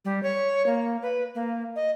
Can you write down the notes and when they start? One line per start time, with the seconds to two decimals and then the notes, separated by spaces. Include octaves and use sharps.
0.05 G3
0.23 C#5
0.66 A#3
1.02 B4
1.35 A#3
1.76 D#5